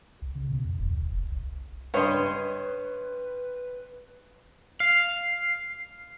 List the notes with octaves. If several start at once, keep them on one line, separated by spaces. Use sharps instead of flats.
C2
C#3
B2
F2
E1
D2
F1
C2
G2 B4 C#5 D#5 C6
F5